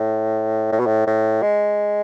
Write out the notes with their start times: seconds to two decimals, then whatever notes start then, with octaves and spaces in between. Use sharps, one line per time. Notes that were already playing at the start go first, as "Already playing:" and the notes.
Already playing: A2
0.72 A2
0.79 B2
0.86 A2
1.07 A2
1.42 G#3